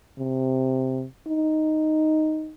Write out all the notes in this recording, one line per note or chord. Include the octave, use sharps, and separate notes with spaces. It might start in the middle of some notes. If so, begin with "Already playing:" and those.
C3
D#4